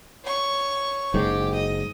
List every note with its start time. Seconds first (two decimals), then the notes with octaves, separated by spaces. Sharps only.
0.24 C#5 C#6
1.14 F#1 G#2 G4
1.54 D#5